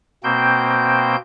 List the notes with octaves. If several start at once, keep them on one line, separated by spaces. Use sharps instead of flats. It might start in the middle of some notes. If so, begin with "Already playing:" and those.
B2 A#3 C4 C5 G5 G6